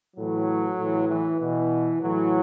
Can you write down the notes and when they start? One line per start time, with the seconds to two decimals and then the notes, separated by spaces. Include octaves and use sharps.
0.17 A2 E3 F#3
0.78 A2 E3
1.09 E3
1.40 B2 E3
2.01 A2 E3 F#3